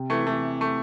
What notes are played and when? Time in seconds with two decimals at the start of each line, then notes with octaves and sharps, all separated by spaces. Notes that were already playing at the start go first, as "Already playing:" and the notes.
Already playing: C3
0.10 E3 A3
0.26 E3 A3
0.61 A3